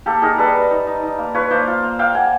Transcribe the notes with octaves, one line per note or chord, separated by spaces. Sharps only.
A#3 G4 A4
D#4 G#4 A#4
G3 A4 B4
G3
D#4
D#4
D#4
A#3
F4 B4 C#5
A#3 C5 D5
F4
A#3
A#3 F5 G5
A#3 F#5 G#5